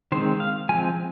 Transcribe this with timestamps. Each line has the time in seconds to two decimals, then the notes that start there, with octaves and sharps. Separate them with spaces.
0.12 D#3 G#3 C4 C5
0.40 F5
0.69 F3 G#3 C4 G#5